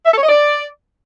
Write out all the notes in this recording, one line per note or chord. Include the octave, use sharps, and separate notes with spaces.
E5
A4
C#5
D#5
D5